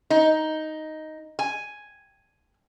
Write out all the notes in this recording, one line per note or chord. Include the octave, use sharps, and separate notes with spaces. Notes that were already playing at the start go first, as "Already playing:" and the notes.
D#4
G#5